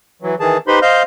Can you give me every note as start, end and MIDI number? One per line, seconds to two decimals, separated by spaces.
0.22 0.35 52
0.22 0.35 54
0.40 0.57 51
0.40 0.57 52
0.40 0.57 68
0.40 0.57 81
0.67 0.79 63
0.67 0.79 67
0.67 0.79 71
0.67 0.79 72
0.67 0.79 83
0.67 0.79 84
0.82 1.03 72
0.82 1.03 75
0.82 1.03 77
0.82 1.03 89
0.82 1.03 91